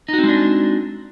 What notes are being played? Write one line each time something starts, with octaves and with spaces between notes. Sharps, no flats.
G#3 C4 D4 D#4 F#4